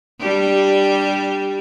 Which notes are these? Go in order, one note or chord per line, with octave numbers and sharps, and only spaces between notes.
G3 D4 G4